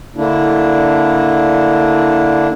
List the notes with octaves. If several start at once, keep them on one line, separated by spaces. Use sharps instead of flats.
D3 A#3 D4 E4